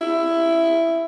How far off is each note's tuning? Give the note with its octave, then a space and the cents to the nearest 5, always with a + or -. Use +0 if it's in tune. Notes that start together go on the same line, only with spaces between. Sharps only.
E4 +10